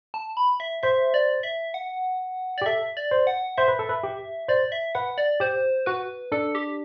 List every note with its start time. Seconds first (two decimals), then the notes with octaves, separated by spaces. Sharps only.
0.14 A5
0.37 B5
0.60 E5
0.83 C5 E5
1.14 D5
1.43 E5
1.74 F#5
2.58 D5
2.62 G4
2.66 A4 E5
2.97 D5
3.11 C5
3.27 F#5
3.58 C5 E5
3.68 B4
3.79 A4
3.89 B4
4.03 G4
4.48 C5 D5
4.72 E5
4.95 B4 F#5
5.18 D5
5.40 G4 C5
5.86 F#4 B4
6.32 D4 A4
6.55 G4